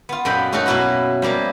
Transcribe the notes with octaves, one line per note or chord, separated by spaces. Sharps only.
B3 F4
F#2 A#2 A4 D#5 G5 B5
A3 C#4 D#4 F#4 A4 A#4
B2 A#3 E4 F#4 B4
F3 G3 A#3 E4